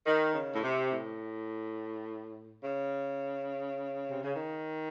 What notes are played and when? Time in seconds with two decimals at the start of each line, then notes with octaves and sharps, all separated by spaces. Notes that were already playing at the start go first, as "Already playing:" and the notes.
0.06 D#3
0.34 C#3
0.55 A2
0.63 C3
0.92 A2
2.63 C#3
4.11 C3
4.23 C#3
4.34 D#3